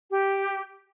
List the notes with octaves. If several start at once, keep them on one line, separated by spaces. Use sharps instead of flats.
G4